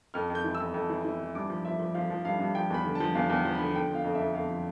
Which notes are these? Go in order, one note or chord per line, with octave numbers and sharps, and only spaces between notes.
F2 F6
F2
G6
E3
E6
F2
F2
E3
E3
E3
G2 D6
F3
F3 E5
F3
F3 F5
F3
G2 F5
G2
F3 G5
E2 B5
D3
A5
F3
E2 F5
E2
G5
F3
D3 B5
D3 G5
F3 F5
F2
E5
F2
F2 F5
F3